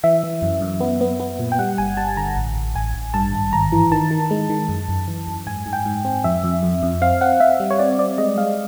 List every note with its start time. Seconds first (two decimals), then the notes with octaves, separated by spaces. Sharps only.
0.04 E3 E5
0.23 E3
0.42 F#2
0.61 F#2
0.80 B3
1.01 B3
1.20 B3
1.39 A#2
1.52 G5
1.59 G3 F#5
1.78 G1 G#5
1.97 G3 A5
2.17 D3 A#5
2.36 A1
2.56 A1
2.75 A1 G#5
2.94 A1
3.14 G2 A5
3.33 G#1
3.53 G#1 A#5
3.72 E3
3.91 D#3 A5
4.11 D#3
4.30 G#3
4.49 D#3
4.69 F#2
4.88 F#2
5.07 E3
5.27 F#2
5.47 G#2 G#5
5.66 G#2
5.73 G5
5.85 G#2
6.05 C4
6.24 F2 E5
6.44 F2
6.63 F2
6.83 F2
7.02 C4 F5
7.21 C4 F#5
7.40 C4 E5
7.60 G3
7.70 C#5
7.79 C4 D5
7.99 C4 D5
8.18 G#3 D#5
8.38 G#3 F5